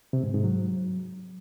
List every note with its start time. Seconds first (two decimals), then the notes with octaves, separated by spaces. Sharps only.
0.13 C3
0.23 G#2
0.34 G#2
0.44 F#3